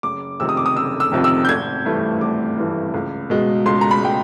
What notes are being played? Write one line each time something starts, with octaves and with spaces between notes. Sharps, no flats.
F#1 D6
F2 C3 D#3 E6
D#6
D6
D#6
F#1 E6
E6
F2 C3 D#3
E6
G6
G#1 G#6
G2 E3 A3
G#1 D6
G2 E3 A3
C#2
B2 G#3
C#2 C6
A#5
B5
B2 G#3 G5